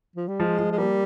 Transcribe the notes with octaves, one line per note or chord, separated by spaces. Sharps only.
F3
G3
F3 G#3
F3
G#3
G3 A#3